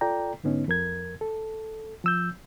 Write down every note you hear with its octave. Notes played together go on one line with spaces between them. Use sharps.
F4 A4 D5 G5 A#5
G#2 D3 B3 C#4 D#4
F2 A#4 G#6
A4
F3 E6 G6